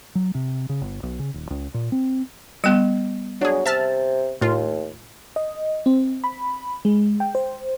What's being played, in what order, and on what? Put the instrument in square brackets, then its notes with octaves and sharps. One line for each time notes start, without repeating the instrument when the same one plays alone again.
[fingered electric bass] F#3
C3
C#3
G1
B1
C#3
D#1
C#2
A#2
C4
[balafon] G3 B3 [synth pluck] D#7
[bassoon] F#3 [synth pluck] D4 G#4
[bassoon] C3 [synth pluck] E5 A5 F6
[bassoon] D#2 [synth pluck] A2 F4
[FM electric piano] D#5
C4
B5
G#3
G5
C5